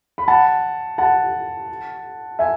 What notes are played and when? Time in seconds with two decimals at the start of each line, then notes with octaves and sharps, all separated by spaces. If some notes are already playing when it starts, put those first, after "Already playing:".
0.18 B5
0.28 F#5 A5
0.98 F#5 A5
2.39 E5 G#5